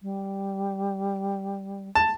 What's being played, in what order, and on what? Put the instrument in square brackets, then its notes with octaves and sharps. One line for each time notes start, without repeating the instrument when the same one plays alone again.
[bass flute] G3
[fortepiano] A5